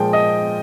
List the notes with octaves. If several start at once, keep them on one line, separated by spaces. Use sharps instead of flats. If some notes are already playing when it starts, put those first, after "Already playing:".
Already playing: A#2 F3 G#3 G5
D#5